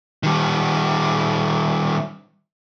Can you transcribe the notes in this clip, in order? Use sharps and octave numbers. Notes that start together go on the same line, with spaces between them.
D#3 G3